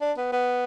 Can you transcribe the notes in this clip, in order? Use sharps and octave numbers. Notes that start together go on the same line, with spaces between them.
D4
B3
B3